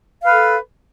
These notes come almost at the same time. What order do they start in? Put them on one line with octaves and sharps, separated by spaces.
F5 B4 A4